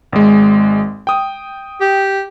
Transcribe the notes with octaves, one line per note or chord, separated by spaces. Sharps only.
G#1 G#3
G5 D#6
G4